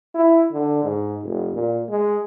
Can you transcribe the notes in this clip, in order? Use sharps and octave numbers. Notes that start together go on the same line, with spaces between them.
E4
D3
G#2
F1
A#2
G#3